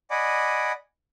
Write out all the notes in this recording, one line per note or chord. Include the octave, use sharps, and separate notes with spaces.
D5 D#5 F#5 G#5 B5 D6